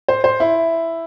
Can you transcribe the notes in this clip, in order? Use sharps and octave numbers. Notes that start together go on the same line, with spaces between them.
C5
C5
E4